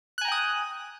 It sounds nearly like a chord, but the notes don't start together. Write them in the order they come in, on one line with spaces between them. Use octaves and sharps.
F#6 G#5 A#5 G5 D#6